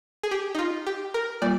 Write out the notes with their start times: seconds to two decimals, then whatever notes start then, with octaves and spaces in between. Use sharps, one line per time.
0.23 G#4
0.31 G4
0.55 D#4
0.59 F4
0.86 G4
1.14 A#4
1.42 G3 A#3 F4 D5